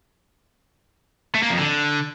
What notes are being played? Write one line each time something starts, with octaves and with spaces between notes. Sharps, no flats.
A3
A#3
F2
D3